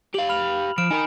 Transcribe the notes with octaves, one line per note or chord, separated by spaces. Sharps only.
G4 F5 F#7
B5 F6 F7
F3 F6 D7 E7
D#4 A#4 G#5 B5